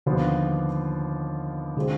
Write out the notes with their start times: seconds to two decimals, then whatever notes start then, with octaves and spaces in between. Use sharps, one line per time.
0.06 D#2 D3 F3 B3 F4
1.77 D3 G#3 C4 F4